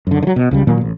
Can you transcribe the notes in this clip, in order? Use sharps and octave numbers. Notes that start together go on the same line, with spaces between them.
F#2 D3
D3 F#3
B2
C#2 C#3 G3
A#2 D#3 F#3 A#3
A1